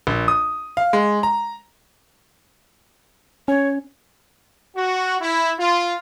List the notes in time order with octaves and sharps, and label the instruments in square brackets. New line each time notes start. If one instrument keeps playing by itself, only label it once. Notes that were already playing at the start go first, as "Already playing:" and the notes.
[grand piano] A#1
D#6
F5
G#3
A#5
[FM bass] C#4 [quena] C#5
[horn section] F#4
E4
F4